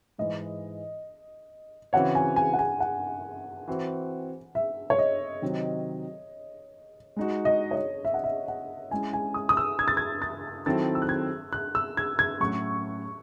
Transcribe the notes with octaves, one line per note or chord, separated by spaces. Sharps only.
G#2 E3 G#3 D#5
C#3 E3 C4 F#4 C#5 F#5
G#5
G#5
F#5
G#5
F#5
E3 C4 F#4 C5
E5
C#5
D#5
C3 D#3 F#3 C4
G#3 D#4 F#4
D#5
C#5
D#5
E5
F#5
E5
F#5
G#3 C#4 E4 G#5
G#5
D#6
D#6
E6
G#6
A6
G#6
A6
D#3 F#3 C4 E4 A4 A6
E6
F#6
G#6
F#6
E6
G#6
G#6
A2 F#3 C#4 F#4 C#6